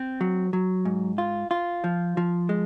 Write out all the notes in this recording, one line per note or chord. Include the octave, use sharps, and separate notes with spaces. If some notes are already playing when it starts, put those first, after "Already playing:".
Already playing: C4
F#3
F#3
G#2
F4
F4
F3
F3
G#3